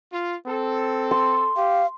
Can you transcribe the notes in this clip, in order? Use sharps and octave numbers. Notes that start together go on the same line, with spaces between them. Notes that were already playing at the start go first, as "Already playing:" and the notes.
F4
C4 A4
C6
G4 F5